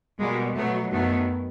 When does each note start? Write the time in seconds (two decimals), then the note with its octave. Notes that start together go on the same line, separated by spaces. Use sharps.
0.20 B2 G3 G#3 A#3
0.55 B2 F#3 A3 B3
0.91 F#2 D#3 F#3 A3 B3